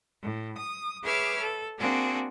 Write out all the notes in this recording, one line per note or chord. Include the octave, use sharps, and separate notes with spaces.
A2
D#6
G#4 B4 C#5 E5 D6 F6
A4
A#3 C4 D4 F#4 G#4